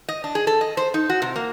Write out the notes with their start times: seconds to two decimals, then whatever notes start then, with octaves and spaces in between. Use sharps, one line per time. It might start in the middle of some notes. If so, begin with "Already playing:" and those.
0.09 D#5
0.24 D4
0.35 G#4
0.47 A4
0.61 D#5
0.77 C5
0.94 D#4
1.10 F#4
1.22 C3
1.36 A#3